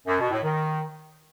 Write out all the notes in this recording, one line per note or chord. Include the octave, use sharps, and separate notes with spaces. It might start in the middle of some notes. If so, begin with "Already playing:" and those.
F#2
B2
A2
D#3